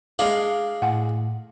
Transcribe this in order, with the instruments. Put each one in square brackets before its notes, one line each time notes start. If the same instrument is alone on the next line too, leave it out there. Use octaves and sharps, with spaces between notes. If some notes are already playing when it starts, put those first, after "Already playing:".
[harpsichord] G#3 D4 [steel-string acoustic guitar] F5
[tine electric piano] A2 [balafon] F#5 G#5